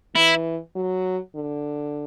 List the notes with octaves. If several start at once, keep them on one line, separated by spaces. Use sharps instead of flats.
E3 E4
F#3
D3